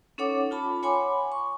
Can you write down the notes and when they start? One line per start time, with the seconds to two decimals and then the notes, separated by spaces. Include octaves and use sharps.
0.18 C#4 D#4 A4 C#5 F#5 D6
0.51 F4 A5 B5
0.83 C#5 F#5 G#5 B5 C6 D6
1.32 C#6